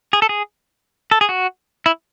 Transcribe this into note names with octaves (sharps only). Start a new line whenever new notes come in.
G#4
A4
G#4
A4
G#4
F#4
E4